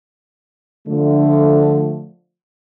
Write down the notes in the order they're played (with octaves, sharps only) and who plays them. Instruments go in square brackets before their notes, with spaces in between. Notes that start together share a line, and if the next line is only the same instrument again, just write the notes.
[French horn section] D3 F3 A3